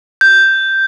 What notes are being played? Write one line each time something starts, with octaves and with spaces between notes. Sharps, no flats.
G6